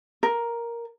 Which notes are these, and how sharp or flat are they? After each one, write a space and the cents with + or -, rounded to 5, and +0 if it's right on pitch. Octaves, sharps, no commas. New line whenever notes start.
A#4 +5